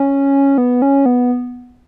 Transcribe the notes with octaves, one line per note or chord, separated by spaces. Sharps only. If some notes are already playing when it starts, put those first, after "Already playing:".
Already playing: C#4
B3
C#4
B3